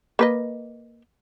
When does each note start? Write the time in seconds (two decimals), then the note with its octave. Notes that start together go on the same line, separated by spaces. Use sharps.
0.19 A#3 B4 D#5